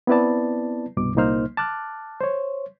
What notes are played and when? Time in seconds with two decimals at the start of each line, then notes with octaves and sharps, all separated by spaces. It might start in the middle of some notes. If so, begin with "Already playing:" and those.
0.07 B3 C4 E4 B4 D5 A5
0.97 C2 G2 B2 D6
1.16 C2 A#2 A#3 D#4 C5 F6
1.57 A5 D6 F6 F#6
2.21 C5 C#5